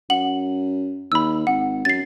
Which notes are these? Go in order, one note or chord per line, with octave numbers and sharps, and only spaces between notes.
F#2 F#5 F#7
D#2 B5 E6
G#1 F#5
F#2 A6 C7